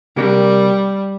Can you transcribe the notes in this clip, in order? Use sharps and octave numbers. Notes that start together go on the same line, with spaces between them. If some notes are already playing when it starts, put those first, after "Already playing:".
C3 G3 A#3 G4 A#4 D5